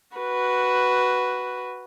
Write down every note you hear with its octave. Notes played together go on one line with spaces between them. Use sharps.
F#4 B4